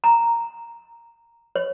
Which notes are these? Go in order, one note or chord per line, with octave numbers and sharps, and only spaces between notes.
A#5
C#5